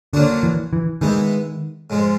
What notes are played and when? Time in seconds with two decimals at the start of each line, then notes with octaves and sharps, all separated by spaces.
0.13 A#2 D3 F#3 A#3 D4 F#4
0.43 E3
0.73 E3
1.01 D#3 E3 G#3 B3
1.90 G#2 F3 G#3